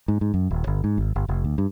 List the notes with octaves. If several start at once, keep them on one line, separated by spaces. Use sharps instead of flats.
G#2
G#2
F#2
D#1
G1
G#2
G#1
G1
F1
D2
G2